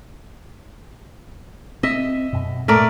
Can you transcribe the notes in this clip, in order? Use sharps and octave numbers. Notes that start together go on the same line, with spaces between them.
C4 D#5 E5
F#2 B2
A2 A3 A#4 D5